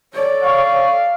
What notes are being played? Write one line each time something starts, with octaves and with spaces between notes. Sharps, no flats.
A4 C#5 D5
F5 C#6